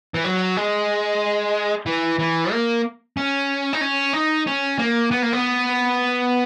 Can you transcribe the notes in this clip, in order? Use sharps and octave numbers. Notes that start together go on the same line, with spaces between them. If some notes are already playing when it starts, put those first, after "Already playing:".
E3
F#3
G#3
E3
E3
A#3
C#4
D#4
C#4
D#4
C#4
A#3
B3
A#3
B3